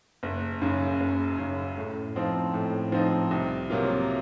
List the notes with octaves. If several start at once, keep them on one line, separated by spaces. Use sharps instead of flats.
F#1
F#2 C#3
F#1
F#2 C#3
A2
F3 C4 D#4
A2
F3 C4 D#4
C2
C3 F#3 A#3 F4